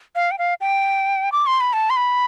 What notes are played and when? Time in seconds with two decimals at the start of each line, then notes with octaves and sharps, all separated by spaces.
0.15 F5
0.31 G5
0.39 F5
0.61 G5
1.32 D6
1.47 C6
1.60 B5
1.73 A5
1.90 C6
1.96 B5